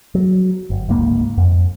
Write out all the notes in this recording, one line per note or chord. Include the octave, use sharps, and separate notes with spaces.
F#3
G1
D1 C#2 G#2 A#3
F2